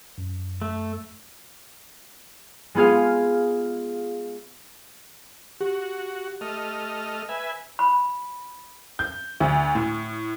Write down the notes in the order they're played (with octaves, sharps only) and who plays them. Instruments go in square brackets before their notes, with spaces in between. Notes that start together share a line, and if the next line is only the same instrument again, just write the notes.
[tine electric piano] F#2
[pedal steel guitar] A3
[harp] G#3 B3 F4 G#4 F5
[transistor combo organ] F#4 [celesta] G4
[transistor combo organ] A3 D#5 F6
B4 E5 G#5
[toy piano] B5
[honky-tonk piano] G6
D2
A2